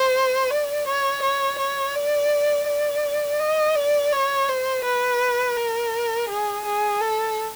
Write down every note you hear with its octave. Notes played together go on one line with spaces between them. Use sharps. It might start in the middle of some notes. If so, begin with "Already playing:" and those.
Already playing: C5
D5
C#5
C#5
C#5
D5
D5
D#5
D5
C#5
C5
B4
A#4
G#4
G#4
A4